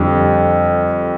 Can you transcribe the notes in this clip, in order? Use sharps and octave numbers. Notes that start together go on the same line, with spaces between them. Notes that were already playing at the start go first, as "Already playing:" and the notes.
Already playing: F2 D3 G3